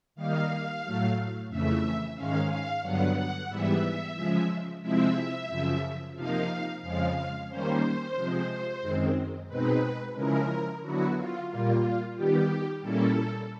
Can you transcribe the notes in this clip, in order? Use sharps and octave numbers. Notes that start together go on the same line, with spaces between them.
D#3 G3 A#3 D#4 F5
A2 F#3 A3
F2 C#3 E3 A3 E5
G#2 D#3 G#3 C#4 F5
F5
G2 D3 F#3 B3 F#5
F#5
G#2 E3 G3 B3 E5
C#3 F3 G#3
C3 F3 G#3 C4 E4 E5
F#2 C#3 F3
C3 F3 A#3 D#4 F5
F2 C#3 F3 G#3 F5
D#3 G3 A#3 C#4 C5
C3 F3 G#3
F#2 D#3 G#3 C4
B2 G#3 C4 D#4 B4
C#3 F3 G#3 C#4 E4 A#4
D3 F#3 B3 E4 F#4
F4
A#2 G3 A#3 F4
D#3 G3 B3 G4
A#2 G3 A#3 C#4 E4 A4